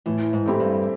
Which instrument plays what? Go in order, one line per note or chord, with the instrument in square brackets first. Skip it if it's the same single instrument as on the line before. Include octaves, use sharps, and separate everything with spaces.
[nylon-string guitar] A2 [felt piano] E3
[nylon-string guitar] G#2
[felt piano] A3 C4 E4 G4
[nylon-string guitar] G2